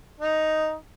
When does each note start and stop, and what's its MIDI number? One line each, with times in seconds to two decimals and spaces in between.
0.20 0.75 63